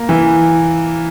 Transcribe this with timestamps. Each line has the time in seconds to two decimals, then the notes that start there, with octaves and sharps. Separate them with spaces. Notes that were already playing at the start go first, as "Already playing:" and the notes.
Already playing: A#3
0.09 E3